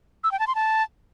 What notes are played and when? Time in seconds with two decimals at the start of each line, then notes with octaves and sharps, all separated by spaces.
0.24 E6
0.32 G5
0.39 A5
0.47 C6
0.55 A5